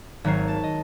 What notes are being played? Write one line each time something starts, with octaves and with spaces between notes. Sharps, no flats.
G#1 F#3 A#4 C#5 C7
A5
D#5